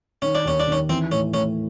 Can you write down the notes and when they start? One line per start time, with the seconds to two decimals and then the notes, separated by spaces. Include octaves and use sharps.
0.22 D#3 C#4
0.35 D4
0.45 D#2 C#4
0.60 D4
0.68 D#3 C#4
0.89 E3 C4
1.11 A2 C#4
1.34 A2 C#4